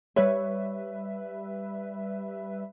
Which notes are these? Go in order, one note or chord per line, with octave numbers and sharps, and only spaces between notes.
G3 B4 C#5 E5